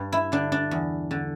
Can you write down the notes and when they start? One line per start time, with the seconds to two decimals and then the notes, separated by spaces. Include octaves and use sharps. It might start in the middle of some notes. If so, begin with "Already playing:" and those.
Already playing: G2
0.13 E4
0.32 D3 D4
0.52 D4
0.71 E2
1.11 D3